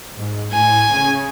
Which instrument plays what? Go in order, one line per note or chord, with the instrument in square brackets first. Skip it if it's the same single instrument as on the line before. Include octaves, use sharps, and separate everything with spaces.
[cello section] G#2
[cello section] A2 [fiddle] G#5
[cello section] C#3